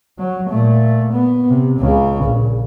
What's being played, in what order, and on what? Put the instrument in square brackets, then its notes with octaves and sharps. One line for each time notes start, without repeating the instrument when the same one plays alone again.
[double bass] F#3
A#2 A3
B3
C3
C#2 C#3
A#1